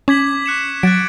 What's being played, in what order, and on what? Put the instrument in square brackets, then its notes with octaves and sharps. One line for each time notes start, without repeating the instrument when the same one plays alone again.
[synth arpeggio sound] C#4 [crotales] D6 G#6 B6 F#7
[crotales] C#6 F#6 C#7 E7
[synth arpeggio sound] F#3 [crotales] F#6 A6 D7